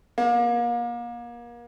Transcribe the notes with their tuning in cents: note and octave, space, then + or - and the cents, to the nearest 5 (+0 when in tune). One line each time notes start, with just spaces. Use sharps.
A#3 +35